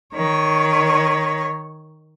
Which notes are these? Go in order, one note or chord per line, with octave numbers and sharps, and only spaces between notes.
D#3 C#5